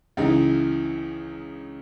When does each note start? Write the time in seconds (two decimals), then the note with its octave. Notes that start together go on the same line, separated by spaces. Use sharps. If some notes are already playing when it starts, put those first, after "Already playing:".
0.17 C#2 C#3 E3 D#4